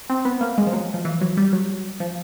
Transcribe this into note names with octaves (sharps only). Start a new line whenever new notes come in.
C4
B3
A#3
G#3
F3
F#3
F3
E3
F#3
G3
F#3
F3